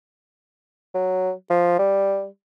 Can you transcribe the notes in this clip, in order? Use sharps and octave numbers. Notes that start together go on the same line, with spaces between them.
F#3
F3
G3